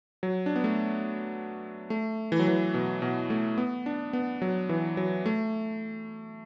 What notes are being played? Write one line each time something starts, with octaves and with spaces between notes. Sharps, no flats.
F#3
D4
B3
A3
A3
E3
F#3
E3
B2
B2
A3
B3
D4
B3
F#3
E3
F#3
A3